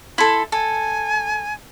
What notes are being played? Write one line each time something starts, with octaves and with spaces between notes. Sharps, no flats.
E4 A4 C6
A4 G#5